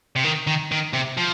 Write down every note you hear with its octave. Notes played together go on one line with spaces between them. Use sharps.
C3
D#3
D#3
D#3
C3
F3